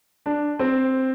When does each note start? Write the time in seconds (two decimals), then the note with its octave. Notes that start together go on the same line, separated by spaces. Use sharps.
0.26 D4
0.59 C4